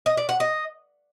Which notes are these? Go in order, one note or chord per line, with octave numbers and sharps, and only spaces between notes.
D#5
D5
F#5
D#5